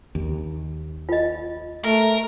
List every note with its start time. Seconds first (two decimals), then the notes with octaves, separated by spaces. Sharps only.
0.15 D#2
1.09 F4 D#5
1.84 A3 A#4